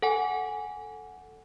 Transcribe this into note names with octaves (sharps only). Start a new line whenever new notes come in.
A4 F#5 G#5